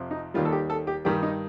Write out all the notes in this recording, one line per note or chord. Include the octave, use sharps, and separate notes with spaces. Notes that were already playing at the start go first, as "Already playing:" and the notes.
Already playing: F2 C3 F3
D#4
D#2 D#3 G3 F4
A4
G4
A4
G4
G2 D#3 G3 G4
D#4